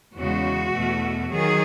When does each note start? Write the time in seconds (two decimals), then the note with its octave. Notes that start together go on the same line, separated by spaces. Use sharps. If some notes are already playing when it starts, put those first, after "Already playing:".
0.15 E2 C#3 G#3 F#4
0.73 E2 B2 A3
1.31 D#3 F#3 G#4